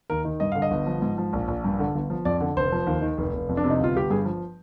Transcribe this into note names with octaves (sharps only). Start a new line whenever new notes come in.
D#2 A#4
D#3
G2 D#5
D3 F5
D#5
G1
F3
G#2
F3
A#1
A#1
G2
D3
G1
F3
F2 D5
D3
F1 C5
F3
D#2
D#3
F1
F1
F2
D4
C3
D#4
G1 F4
G1 G4
G2 G#4
F3